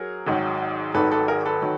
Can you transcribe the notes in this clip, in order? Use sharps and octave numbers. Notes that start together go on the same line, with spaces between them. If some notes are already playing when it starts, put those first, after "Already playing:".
Already playing: F#3 G#4 A#4
G#1 G#2 D#3 F#3
G#1 G#2 D#3 F#3 A4 B4
A4 B4
G#4 A#4
A4 B4
D#3 F#3